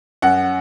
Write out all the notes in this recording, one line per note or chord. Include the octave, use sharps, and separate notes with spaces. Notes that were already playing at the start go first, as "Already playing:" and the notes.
F#2 F#5